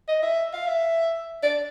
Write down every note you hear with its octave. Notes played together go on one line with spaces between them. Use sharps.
D#5
E5
F5
E5
D5